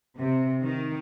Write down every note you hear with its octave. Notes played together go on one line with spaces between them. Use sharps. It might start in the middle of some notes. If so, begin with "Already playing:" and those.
C3
D#3